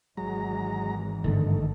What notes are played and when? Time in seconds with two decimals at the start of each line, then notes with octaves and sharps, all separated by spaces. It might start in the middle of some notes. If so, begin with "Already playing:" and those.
0.17 G#1 E3 F#3 G#3 A#5
1.24 G1 G#2 D3 D#3 A3